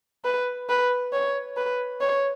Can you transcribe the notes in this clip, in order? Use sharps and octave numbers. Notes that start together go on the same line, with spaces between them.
B4
B4
C#5
B4
C#5